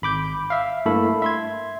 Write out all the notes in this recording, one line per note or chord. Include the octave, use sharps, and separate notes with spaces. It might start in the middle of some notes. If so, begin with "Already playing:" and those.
G#1 B5 D6 G6
E5 F5
G2 A3 A#3 E4 A4 B5
E5 C6 G#6